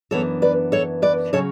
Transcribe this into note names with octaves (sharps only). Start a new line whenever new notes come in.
F#2 E3 B3 D4 A4 C#5
B4 D5
A4 C#5
B4 D5
C#3 F#3 C#4 A4 C#5